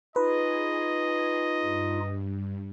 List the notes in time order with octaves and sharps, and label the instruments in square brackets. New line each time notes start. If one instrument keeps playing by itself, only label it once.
[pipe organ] D#4 F4 [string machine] G#4 [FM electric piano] B4 [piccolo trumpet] D#5
[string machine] G2